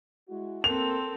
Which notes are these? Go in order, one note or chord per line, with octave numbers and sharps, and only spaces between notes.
G#3 E4 F#4
A#3 C4 A4 A#4 F7